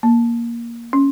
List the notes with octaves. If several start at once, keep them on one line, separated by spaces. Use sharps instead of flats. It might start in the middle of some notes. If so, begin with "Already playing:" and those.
A#3
C#4